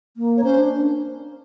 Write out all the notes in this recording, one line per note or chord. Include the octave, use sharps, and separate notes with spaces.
A#3
C#5
C#4 C5
D4